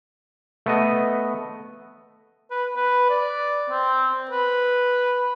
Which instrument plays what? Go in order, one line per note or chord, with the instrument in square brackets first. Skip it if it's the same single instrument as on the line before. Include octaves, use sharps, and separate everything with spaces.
[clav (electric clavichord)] A3 B3 D#5
[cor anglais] B4
B4
D5
C4
B4